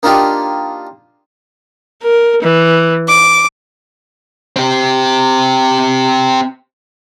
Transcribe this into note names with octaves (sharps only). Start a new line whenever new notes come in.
A#3 D4 D#4 F4 G4
A#4
E3
D6
C4 G4